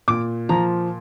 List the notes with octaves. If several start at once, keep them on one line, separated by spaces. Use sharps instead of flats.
A#2 D6
F3 A#5